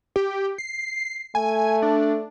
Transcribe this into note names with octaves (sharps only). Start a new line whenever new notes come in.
G4
C7
A3 G#5
D4